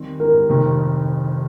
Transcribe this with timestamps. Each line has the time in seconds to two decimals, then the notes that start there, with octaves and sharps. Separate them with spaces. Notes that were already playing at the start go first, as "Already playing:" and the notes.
Already playing: D#3 G3 C4
0.20 A#4
0.49 F1 F2 D#3